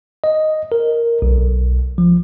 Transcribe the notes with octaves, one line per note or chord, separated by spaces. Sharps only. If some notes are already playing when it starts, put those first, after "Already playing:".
D#5
A#4
B1
F3